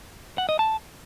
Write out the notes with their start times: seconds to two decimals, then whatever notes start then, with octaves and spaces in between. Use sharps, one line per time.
0.38 F#5
0.49 D#5
0.59 A5